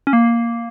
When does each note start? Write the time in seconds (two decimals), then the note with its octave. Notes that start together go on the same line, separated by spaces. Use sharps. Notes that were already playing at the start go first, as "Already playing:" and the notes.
0.07 C#4
0.13 A#3